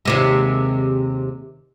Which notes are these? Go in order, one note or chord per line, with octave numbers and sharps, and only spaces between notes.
D#2 C3 G#3